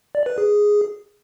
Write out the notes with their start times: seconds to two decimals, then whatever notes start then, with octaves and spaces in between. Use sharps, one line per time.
0.15 D5
0.26 B4
0.38 G#4